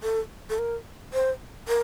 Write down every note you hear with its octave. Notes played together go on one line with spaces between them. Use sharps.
A4
A4
A#4
C5
A#4